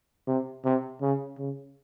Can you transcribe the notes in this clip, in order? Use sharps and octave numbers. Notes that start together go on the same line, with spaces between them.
C3
C3
C#3
C#3